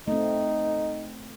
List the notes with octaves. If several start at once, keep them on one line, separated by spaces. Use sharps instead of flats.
A3 C4 D#4